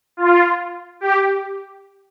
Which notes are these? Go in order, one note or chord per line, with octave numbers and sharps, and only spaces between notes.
F4
G4